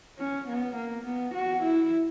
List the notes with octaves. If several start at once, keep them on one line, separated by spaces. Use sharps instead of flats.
C#4
B3
A#3
B3
F#4
E4